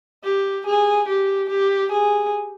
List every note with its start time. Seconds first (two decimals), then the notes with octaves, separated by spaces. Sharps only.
0.24 G4
0.66 G#4
1.08 G4
1.50 G4
1.92 G#4